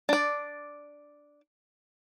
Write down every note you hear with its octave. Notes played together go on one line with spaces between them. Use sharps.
D4 D5